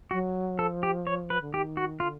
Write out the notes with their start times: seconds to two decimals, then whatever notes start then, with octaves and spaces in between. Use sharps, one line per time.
0.11 F#3 F#4
0.58 F3 A4
0.83 G4
1.07 C#5
1.30 B4
1.41 D3
1.53 D#3 G4
1.77 F#4
2.00 D3 F4